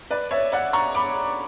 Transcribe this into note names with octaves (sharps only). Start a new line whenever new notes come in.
B4 D5
C#5 E5
D5 F#5
A#5 C#6
B5 D6